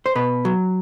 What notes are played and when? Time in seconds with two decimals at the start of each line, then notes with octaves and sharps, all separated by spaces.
0.06 C5
0.15 B2 B4
0.45 F#3